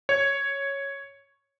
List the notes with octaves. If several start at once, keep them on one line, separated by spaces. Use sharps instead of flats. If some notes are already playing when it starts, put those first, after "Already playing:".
C#5